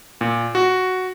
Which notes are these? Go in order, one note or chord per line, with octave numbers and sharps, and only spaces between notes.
A#2
F#4